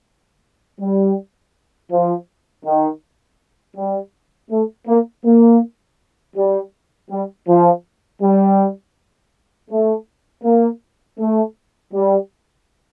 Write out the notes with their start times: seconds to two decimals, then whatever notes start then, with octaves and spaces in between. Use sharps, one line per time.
0.80 G3
1.91 F3
2.66 D#3
3.76 G3
4.51 A3
4.88 A#3
5.25 A#3
6.36 G3
7.11 G3
7.48 F3
8.22 G3
9.70 A3
10.44 A#3
11.19 A3
11.93 G3